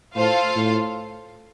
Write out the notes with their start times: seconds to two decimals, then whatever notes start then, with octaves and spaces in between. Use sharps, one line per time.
0.15 A2 F4 A4 C5 F5
0.56 A2